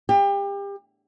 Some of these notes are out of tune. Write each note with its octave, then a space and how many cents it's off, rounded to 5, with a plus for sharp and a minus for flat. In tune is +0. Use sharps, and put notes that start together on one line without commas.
G4 +30